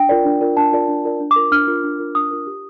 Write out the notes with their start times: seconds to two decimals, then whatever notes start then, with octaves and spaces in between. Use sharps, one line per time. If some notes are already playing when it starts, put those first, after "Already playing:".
Already playing: D4 G5
0.09 F4 A#4 D5
0.25 D4
0.41 F4 A#4 D5
0.57 D4 A5
0.73 F4 A#4 D5
0.88 D4
1.04 F4 A#4 D5
1.20 D4
1.31 D6
1.36 F4 A#4
1.52 D4 F6
1.67 F4 A#4
1.84 D4
1.99 F4 A#4
2.15 D4 D#6
2.31 F4 A#4
2.47 G4